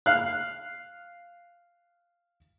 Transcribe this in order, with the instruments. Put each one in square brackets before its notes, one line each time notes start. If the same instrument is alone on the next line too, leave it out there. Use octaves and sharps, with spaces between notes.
[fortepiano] F5 F#6